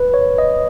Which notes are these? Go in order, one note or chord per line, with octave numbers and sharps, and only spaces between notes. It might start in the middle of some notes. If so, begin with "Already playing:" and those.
Already playing: B4
C#5
D#5